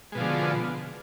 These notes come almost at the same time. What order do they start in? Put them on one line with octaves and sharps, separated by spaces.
G#3 B2 F3 D3